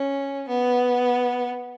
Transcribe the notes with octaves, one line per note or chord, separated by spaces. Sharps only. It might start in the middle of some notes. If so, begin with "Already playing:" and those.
Already playing: C#4
B3